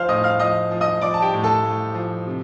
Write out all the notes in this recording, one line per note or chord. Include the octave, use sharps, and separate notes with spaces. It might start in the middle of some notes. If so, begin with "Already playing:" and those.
Already playing: F3 C5 F5 F6
A2 D#5 D#6
F5 F6
F3 D#5 D#6
F3
D#5 D#6
F3 D5 D6
A5
G4 G5
A2
A4 A5
A2
F3
C3